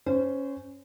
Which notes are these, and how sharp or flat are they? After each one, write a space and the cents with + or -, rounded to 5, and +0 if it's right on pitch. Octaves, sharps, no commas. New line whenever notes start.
C#4 +0 C5 -25